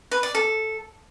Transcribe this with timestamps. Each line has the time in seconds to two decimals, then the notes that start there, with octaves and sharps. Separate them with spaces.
0.11 B4
0.23 D5
0.35 A4